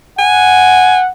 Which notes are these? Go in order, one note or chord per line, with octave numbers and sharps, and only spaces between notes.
F#5 G#5